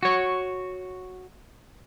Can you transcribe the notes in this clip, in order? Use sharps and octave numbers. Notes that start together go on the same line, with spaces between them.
F#4 C#5